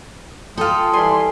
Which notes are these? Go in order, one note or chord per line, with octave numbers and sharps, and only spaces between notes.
G#3 F4 A4 G5
E3 G3 G#5 C6